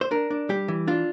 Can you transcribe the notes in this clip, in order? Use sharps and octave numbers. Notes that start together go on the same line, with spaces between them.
C5
D4 A#4
D4
G3 G4
E3
D4 F4